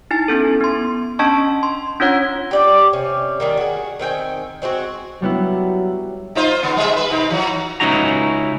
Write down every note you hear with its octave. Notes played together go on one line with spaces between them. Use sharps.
D#4 E4 G#5 A6
B3 C#4 A4
B3 C6
C#4 D4 D#5 A5 C#6
C6
C#4 D4 F4 C#5 F#5 G#6
G4 D5 G5
C3 C#4
D#3 G3 A#3
F#4 G#4
D#3 C4 G5 G#5
G#3 C4 E4 F#4
F#3 G3 B3 E4
D#4 F4 C5
C#3 B3
G3 G#3 E5
B4
C3 D#4
E3 F#3
C#2 C#4 D#4 E4 F#4 A#5